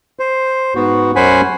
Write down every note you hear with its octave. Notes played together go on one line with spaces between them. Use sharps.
C5
G#2 B3 F#4
F#2 C#4 C5 F#5 G#5 B5